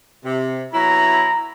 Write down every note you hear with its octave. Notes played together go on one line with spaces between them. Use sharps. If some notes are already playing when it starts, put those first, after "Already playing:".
C3
F#3 B3 E4 A#5